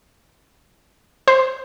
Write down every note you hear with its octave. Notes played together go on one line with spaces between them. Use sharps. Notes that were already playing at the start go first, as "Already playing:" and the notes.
C5